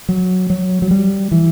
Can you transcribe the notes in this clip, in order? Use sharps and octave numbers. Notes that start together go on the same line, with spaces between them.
F#3
F#3
F#3
G3
E3